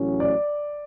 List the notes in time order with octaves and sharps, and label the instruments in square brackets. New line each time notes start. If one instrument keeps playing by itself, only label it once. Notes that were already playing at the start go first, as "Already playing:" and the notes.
Already playing: [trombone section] A1 A2 F#3 C#4
[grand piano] D5